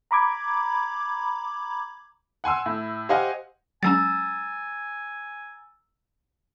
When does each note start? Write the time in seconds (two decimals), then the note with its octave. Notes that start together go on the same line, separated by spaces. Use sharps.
0.11 A#5 B5 D6 G#6
2.44 F#5 G#5 C6 E6
2.66 A2
3.09 G4 C5 D#5 F5 F#5 G#5
3.83 F#3 G#3 C#4 G#5 A#5 E6 A6